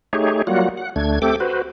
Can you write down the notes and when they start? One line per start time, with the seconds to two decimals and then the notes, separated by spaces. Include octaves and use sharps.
0.13 A3 D#4 G4 G#4 C#5
0.47 F#3 G3 A#3 F4 F#4 F#5
0.77 F#5
0.96 D2 A3 D4 G#6
1.22 A3 C4 G4 A4 G5 D6
1.40 F#4 B4 C5